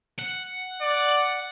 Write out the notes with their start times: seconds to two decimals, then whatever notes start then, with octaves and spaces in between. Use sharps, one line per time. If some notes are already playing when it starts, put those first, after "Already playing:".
0.19 F#5
0.81 D5